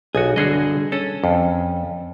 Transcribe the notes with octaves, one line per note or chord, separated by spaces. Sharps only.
B1 F#4 G#4
G2 D3 F#4 G#4 D#5
C#4 A4
F2